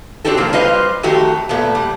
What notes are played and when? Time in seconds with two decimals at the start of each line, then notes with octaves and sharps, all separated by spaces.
0.25 C4 D4 D#4 F#4 G4 A4
0.37 A2 C3 F3 A#3
0.53 G3 F4 B4 C5 D#5 F5
1.03 F2 D#3 A3 F#4 G4
1.49 A#2 A3 B3
1.75 G3